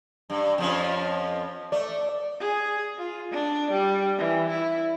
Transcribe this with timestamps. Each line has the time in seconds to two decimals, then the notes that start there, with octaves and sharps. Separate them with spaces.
0.30 G2
0.58 F2 F3 C#4
1.72 A3 D5
2.40 G#4
2.98 F4
3.32 D4
3.71 G3
4.18 E3
4.49 E4